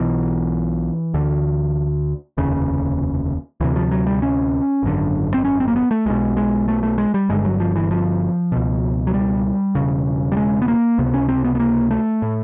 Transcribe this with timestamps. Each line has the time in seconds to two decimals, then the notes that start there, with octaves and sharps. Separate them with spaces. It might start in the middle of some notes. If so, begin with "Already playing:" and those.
Already playing: B1 B2 E3
1.14 D2 D3
2.37 F1 D#2 C#3
3.61 D2 C3 E3
3.76 F3
3.91 F#3
4.06 G3
4.22 C#4
4.83 G#1 F#2 D3
5.34 C4
5.45 C#4
5.60 C4
5.68 A#3
5.76 B3
5.91 A3
6.06 B1 B2 G#3
6.37 G#3
6.68 A3
6.83 A3
6.98 G#3
7.14 G3
7.29 G1 G2 D3 G#3
7.45 F#3
7.60 F3
7.76 E3
7.91 F3
8.52 C#2 B2
9.07 F#3
9.14 G3
9.75 E1 D#2 C#3
10.32 G3
10.37 G#3
10.62 B3
10.68 A#3
10.98 C#2 C3 B3
11.14 C#4
11.29 C4
11.44 B3
11.55 B3
11.60 A#3
11.91 A3
12.22 A2